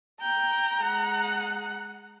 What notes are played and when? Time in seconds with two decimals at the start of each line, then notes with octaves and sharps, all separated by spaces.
0.21 G5 A#5
0.80 G#3 F#5